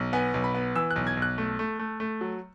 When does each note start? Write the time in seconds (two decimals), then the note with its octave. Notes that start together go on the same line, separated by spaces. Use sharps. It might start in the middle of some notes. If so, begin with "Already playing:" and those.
Already playing: B1
0.13 B3 G#5
0.34 B1
0.44 B5
0.55 B3
0.76 E3 E6
0.91 F#6
0.96 B1
1.07 G#6
1.17 B1
1.22 F#6
1.38 A3
1.59 A3
1.79 A3
2.00 A3
2.21 F#3